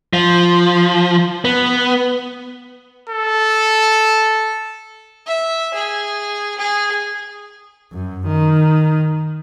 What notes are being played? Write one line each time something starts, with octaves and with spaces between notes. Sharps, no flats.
F3
B3
A4
E5
G#4
G#4
F#2
D#3